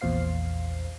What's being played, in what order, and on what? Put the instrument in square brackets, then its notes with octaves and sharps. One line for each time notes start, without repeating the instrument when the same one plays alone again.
[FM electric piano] A#1 E2 A#2 C5 F5 C7